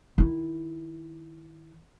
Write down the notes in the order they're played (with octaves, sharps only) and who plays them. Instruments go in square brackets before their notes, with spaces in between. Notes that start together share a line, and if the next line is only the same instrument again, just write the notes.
[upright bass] D#3 E4